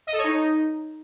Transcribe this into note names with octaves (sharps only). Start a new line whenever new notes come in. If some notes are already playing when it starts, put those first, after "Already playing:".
D#5
A4
C#5
D#4